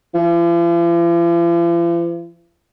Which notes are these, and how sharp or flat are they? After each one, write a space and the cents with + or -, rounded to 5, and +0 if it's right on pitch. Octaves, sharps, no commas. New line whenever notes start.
F3 -45